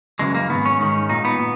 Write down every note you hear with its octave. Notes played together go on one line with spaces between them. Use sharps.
F#2 C#3 E3 G#3
A#3
G#2 D#3 B3
C#4
G#2 D#3
A#2 D#4
B3
A#2